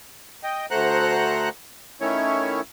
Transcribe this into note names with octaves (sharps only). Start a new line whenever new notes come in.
D#5 G5
D2 A3 C5 F#5 A#5 F#6
D#3 A3 C#4 E4 C#5